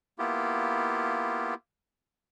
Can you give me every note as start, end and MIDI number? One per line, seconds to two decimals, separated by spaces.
0.19 1.54 58
0.19 1.54 59
0.19 1.54 64
0.19 1.54 65
0.19 1.54 67